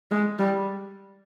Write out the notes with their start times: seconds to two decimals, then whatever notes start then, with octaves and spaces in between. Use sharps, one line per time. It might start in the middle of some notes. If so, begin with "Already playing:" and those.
0.11 G#3
0.39 G3